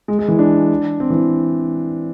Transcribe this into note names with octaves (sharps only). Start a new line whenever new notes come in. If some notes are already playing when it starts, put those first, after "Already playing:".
G#3
G#3
E3
D4
C4
E3